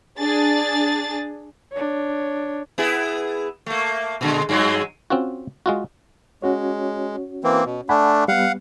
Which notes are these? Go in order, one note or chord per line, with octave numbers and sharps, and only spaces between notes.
D4 G#4 A6
D4 C#5
B3 E4 G#4
A3 A#3
A#2 D3 G#3
G2 F#3 G#3
C4 C#4 F4 F#4
G#3 F4 F#4
G#3 C#4 F#4 C#5
E3 A#3 C4
B2
A3 D4 F#5 G#5 B5
G3 B3 F5 F#5